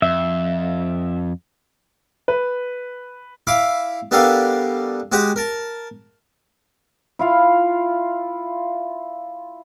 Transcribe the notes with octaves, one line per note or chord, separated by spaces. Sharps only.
F2 E5
B4
E4 F5 B5 D6
G3 B3 D4 A4 A#4 F5
G#3 F#4 G4 C#5 F#5 D#6
A#4 A5
E4 F4 F5